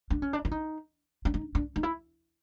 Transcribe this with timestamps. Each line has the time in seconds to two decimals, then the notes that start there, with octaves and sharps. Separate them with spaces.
0.10 D4
0.22 C#4
0.33 D4
0.45 E4
0.51 D#4
1.25 D4
1.34 D#4
1.55 D4
1.76 D#4
1.83 E4